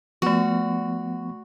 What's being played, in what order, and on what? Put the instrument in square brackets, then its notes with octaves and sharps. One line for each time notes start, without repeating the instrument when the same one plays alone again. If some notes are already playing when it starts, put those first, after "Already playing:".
[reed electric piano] F3 B3 [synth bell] A3 C#6 [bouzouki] F#4